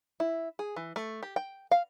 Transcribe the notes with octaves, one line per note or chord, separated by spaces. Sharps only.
E4
G#4
E3
A3
G4
G5
F5